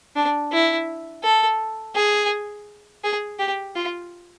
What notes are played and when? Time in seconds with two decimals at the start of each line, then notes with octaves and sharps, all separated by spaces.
0.16 D4
0.53 E4
1.23 A4
1.96 G#4
3.04 G#4
3.39 G4
3.76 F4